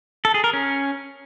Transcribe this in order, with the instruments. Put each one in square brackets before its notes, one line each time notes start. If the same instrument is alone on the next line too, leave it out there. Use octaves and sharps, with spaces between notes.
[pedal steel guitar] A4
G#4
A#4
C#4